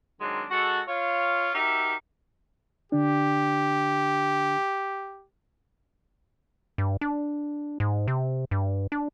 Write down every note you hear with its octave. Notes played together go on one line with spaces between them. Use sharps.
D#3 F#3 G#3 C4 D4
G#3 F#4 A4
F4 C#5 F5
D#4 F#4 G4 A#4 E5
D3 D4 G4
G2
D4
G#2
C3
G2
D4